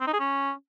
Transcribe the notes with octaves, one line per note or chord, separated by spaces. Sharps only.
C4
D#4
G#4
C#4